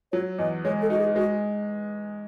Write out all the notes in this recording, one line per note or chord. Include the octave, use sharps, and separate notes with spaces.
F#3 C#5
E2 D#5
G#3 C#5
A4
D#4 F#4
G#4
G#3 F#4